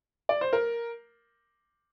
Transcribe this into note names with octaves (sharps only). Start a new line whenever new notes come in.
D5
C5
A#4